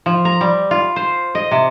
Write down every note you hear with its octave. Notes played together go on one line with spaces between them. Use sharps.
F3
A#5
G3
F4
C5
D#5
C3